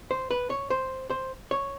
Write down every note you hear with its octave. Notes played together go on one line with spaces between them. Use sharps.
C5
B4
C#5
C5
C5
C#5